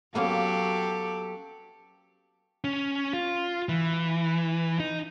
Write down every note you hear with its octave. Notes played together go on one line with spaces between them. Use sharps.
F#3 A#3 B3 C#4 G4 A4 F5
C#4
F4
E3
D#4